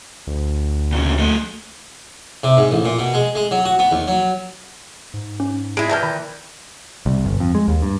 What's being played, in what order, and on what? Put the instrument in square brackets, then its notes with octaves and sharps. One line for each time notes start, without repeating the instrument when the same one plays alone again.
[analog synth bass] D2
[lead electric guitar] A#2 C#3
A3 D#5
[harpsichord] C3
G#2
A1
A#2
B2
G#3
G#3
F#3
F#4
B3
D#2
F#3
[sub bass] G#2
[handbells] C#4
[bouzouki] G#3 E4 [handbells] D7
[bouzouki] A#2 E3 G5 [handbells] E5 A5 F6
[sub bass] D#3 [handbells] B5
[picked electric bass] C2
G1
F2
G#3
D#2
G2